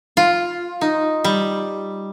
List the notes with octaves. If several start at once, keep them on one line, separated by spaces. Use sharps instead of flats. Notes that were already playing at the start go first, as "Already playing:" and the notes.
F4
D#4
G3